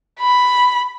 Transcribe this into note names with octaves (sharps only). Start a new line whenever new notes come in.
B5